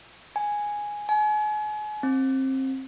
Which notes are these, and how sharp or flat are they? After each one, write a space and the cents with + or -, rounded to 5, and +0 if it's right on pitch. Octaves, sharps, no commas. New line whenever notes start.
G#5 +0
G#5 +35
C4 +25